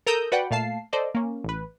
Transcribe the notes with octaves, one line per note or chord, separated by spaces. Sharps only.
A4 A#4 A#5 D#6 E6 G6
F#4 B4 D5 F#5 G5
A#2 A3 F5 A5 C7
A4 C5 D5 D#5
A#3 C#4
A1 B4